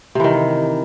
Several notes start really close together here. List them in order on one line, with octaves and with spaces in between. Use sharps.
C3 E3 D#3